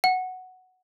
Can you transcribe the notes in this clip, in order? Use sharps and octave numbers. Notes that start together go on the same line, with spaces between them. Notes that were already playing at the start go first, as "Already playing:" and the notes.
F#5